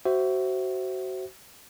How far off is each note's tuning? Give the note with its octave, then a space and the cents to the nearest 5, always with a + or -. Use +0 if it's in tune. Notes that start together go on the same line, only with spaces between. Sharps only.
F#4 +25 C5 +0 E5 +0